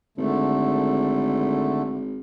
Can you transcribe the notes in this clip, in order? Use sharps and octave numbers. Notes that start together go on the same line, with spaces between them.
G#1 D3 A3